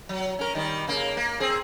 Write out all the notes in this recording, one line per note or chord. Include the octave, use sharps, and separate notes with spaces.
F#3
C#4 A#4
D#3 G3
C#3 A#3
A#3
C4 G#4